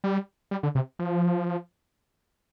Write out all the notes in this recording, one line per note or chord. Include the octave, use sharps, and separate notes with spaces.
G3
G3
D3
C3
F3